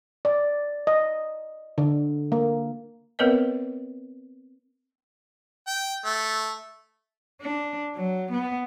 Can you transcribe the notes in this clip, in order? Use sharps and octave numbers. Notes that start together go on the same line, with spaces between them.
D5
D#5
D3
A#3
B3 C4 A#4 B4 C#5 D#5
G5
A3
D4
F#3
B3